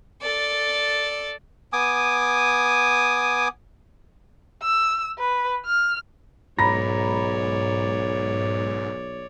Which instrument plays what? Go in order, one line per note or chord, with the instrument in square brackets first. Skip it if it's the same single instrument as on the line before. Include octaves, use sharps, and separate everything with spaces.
[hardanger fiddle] A4 D5
[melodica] B3 G#5 D6 D#6
[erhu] E6
B4
F6
[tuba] B1 [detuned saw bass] G#2 [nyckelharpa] C#5 D5 [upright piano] A#5 B5 A#6